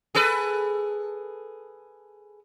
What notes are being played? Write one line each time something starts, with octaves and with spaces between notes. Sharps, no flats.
G#4 A4 B4